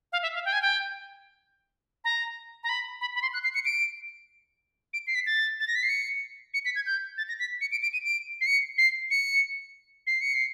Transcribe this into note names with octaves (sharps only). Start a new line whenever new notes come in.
F5
E5
F5
G5
G#5
G5
A#5
A#5
B5
B5
B5
C6
F#6
C7
C#7
D7
D7
C7
B6
A6
A6
A#6
B6
C7
C#7
C#7
B6
G#6
G6
A6
A#6
B6
C#7
D7
D7
D#7
D7
C7
C#7
C7
C#7
C7
C#7
C7